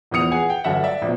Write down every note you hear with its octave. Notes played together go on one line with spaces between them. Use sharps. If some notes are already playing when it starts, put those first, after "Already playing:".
A#1 E2 E3 D#6 C#7 F7
G#4 F#5 G#5
G5
G1 F#3 A4 E5 F#5
D5 E5
A#1 B2